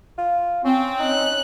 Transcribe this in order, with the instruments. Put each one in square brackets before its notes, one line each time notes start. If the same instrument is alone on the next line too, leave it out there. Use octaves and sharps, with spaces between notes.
[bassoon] F4
[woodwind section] C4 [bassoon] C#4
[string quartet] C#4 F#6 [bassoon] D#4